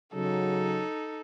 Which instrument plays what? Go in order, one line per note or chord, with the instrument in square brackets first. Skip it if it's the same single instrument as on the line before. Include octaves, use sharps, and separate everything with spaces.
[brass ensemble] C#3 F#3 [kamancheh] D#4 A4